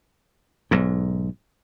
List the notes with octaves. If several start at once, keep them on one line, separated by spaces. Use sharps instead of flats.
B1 G#2